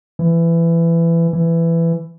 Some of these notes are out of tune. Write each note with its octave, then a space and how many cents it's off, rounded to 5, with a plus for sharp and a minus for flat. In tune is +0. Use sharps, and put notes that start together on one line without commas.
E3 +20
E3 +15